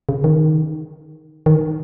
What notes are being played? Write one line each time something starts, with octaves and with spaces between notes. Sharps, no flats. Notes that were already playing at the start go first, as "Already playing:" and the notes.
C#3
D#3
D#3